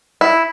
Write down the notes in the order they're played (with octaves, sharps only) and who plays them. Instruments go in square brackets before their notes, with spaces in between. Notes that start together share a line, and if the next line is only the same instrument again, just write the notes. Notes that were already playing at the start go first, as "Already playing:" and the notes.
[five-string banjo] E4